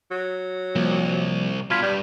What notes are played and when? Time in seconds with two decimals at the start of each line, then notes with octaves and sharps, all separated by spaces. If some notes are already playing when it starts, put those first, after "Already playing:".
0.11 F#3
0.76 C2 F3 G3 A#3
1.70 G2 B2 F4 B5 G#6 B6
1.82 G2 G3